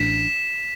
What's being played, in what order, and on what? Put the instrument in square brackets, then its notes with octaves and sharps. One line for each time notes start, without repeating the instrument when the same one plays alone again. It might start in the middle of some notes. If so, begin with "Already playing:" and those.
Already playing: [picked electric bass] A1 A2 A3 D4 [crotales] B6 E7